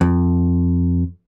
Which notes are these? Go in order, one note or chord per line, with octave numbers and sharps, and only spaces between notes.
F2